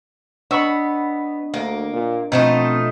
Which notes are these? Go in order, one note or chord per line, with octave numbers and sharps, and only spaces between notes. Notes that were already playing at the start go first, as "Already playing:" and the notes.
B3 D4 C#5 D#5 B5 C#6 E6
D2 A#3
A#2
B2 F3 A3 C4 D#4